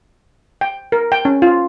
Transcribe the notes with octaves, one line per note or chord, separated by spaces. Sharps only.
G5
A#4
G5
C#4
F4